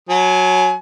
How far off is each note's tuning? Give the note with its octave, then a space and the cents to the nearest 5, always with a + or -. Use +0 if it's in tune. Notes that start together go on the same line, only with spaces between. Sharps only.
F#3 -10 G#5 +30